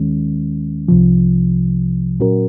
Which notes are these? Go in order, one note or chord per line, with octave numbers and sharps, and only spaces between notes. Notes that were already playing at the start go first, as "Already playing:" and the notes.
Already playing: D#2 D#3 G#3 C#4
C2 C3 F3
A#2 F#3 C#4 F#4 A#4